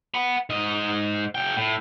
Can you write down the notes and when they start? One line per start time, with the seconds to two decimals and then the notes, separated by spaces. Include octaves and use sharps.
0.14 F#5 B5
0.50 G#2 D#5
1.35 C#3 G5
1.56 A2